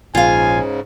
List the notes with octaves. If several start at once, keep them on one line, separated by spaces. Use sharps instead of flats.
A#1 G#2 C#3 F4 F5 G#5